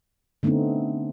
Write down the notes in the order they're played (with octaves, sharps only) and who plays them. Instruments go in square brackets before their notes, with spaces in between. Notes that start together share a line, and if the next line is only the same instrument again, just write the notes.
[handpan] D3 A3 B3 C4 D#4